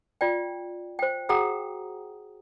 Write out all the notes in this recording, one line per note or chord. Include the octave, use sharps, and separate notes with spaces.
F4 D5 G5
C5 G5
F#4 G#4 F#5 G5 A#5 D#6